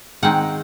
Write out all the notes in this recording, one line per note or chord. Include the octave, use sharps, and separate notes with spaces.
D#3 G#3 C4 D#4 F#5